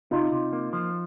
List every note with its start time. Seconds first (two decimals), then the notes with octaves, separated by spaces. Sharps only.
0.11 C3 D#4 F4
0.32 C3
0.53 A#3
0.73 F3